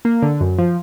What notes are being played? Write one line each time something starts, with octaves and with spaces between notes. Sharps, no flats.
A#3
D3
F#2
F3